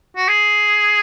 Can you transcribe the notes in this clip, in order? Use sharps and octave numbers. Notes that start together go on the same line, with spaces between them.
F#4
G#4